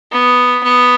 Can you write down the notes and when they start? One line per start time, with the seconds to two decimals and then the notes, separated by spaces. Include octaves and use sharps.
0.12 B3
0.64 B3